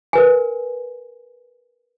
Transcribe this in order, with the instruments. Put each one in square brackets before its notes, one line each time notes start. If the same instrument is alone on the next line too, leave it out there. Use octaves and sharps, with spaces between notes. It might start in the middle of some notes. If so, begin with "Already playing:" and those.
[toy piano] A#4 B4 G#5